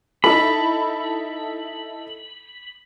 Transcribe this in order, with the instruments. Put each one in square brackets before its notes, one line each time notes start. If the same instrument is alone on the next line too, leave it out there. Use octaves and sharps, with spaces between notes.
[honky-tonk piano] D#4 E4 A4 [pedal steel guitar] B5